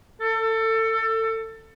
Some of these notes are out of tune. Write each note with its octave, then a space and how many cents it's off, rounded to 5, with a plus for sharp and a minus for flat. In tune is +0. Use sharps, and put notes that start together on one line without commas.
A4 +25